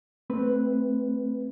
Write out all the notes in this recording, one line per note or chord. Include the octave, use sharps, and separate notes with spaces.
A3 C4 B4